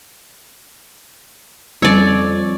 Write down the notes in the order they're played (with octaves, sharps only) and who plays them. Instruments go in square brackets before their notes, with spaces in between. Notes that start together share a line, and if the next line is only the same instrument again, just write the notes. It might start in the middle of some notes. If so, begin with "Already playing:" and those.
[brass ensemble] F2 [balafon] G3 C#4 [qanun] C#5 D5